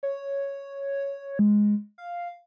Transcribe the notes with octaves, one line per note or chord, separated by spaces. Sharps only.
C#5
G#3
F5